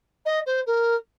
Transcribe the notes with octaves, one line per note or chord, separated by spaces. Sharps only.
D#5
C5
A#4